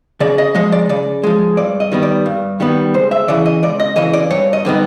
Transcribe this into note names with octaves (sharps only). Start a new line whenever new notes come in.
C#3 D5
D#5
F3 G#3 D#5
D5
C#3 D5
F3 G#3
G2 D5
D#5
D#3 G3 B3
D5
G2
D#3 G3 B3
C#2 C5
E5
C#3 E3 D5
D#5
C#2 D5
D#5
C#3 E3 D#5
D5
G2 C#5
D#5
D3 G3 B3 D#4